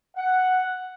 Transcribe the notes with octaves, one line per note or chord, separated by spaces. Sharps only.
F#5